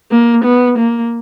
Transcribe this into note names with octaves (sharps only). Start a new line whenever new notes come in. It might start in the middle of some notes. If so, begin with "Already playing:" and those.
A#3
B3
A#3